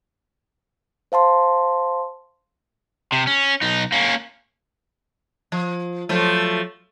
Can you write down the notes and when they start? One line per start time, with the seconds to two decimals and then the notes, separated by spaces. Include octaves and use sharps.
1.12 C5 F5 A5 C6
3.12 C3
3.27 C#4
3.62 B1 D#4
3.92 A#3 C#4
5.52 F3
6.09 F3 F#3 A3